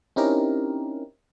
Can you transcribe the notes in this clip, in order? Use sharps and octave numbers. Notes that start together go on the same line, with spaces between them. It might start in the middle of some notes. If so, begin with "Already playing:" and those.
C4 C#4 D#4 E4 G4 A#4